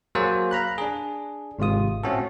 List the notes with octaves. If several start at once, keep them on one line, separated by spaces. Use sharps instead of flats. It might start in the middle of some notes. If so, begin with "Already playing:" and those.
F#3 A#3 G#4 C5
F5 A#5 B5 F#6
D4 G#4
G#1 C3 G#3 F4 D#6
A2 A3 C4 C#4 F#4 A4